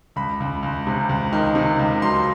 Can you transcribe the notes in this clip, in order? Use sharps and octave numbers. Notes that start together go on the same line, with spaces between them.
C#2 B5
C#2
C#2
C3
C#2
D#3
C3
C#2
F#3 C6